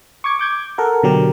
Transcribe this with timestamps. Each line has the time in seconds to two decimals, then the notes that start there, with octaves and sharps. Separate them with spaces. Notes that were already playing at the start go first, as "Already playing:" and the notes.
0.24 C#6 D6 G#6 C#7
0.39 D6 G6 G#6
0.78 A4 A#4 F#5
1.03 B2 D3 F#3 G4 A#4